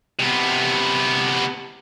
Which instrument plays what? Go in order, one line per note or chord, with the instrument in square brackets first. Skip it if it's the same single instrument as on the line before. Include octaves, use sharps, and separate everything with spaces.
[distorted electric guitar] C3 B3